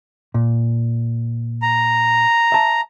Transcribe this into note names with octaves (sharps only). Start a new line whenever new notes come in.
A#2
A#5
E5 A5